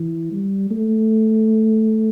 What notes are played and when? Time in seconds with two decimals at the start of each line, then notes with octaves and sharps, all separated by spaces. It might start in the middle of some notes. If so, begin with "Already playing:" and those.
Already playing: E3
0.32 G3
0.71 A3